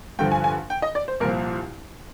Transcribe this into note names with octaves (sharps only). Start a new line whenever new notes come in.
G2 D3 F3 G5
G#5
G#5
G5
D#5
D5
C5
C2 A#2 F3 A#4